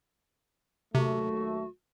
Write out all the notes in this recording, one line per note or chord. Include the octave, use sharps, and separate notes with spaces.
D#2 C3 F#3 A3 F#4